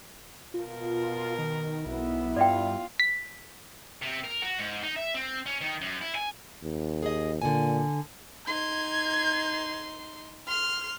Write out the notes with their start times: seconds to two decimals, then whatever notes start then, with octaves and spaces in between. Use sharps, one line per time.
0.54 B2 F4 A#4
1.38 D#3
1.86 B1 B3 E4
2.36 G2 F4 D5 E5 G5
3.00 B6
4.02 C3
4.24 A#4
4.42 F#4
4.59 G#2
4.83 D#4
4.96 E5
5.15 C4
5.46 C#4
5.61 D#3
5.81 F#2
6.01 E4
6.15 G#5
6.63 D#2
7.03 G#4 D#5
7.42 A#2 D3 G#5
8.47 D#4 C6 G#6
10.48 C6 F6 C7